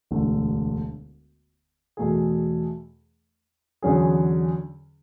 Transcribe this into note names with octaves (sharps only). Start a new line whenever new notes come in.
E1 D2 D3 A3
E2 B2 A3 E4 G#4
E2 D3 F#3 C#4 G#4